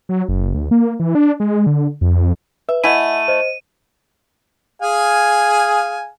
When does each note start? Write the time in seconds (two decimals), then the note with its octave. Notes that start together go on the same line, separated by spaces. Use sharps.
0.09 F#3
0.29 F#1
0.54 D2
0.71 A#3
1.00 E3
1.15 D4
1.40 G#3
1.67 D3
2.01 F2
2.69 B4 E5
2.84 A3 E4 D#5 F#5 G#5 D#7
3.28 C5 D#5
4.81 G#4 F5 G#5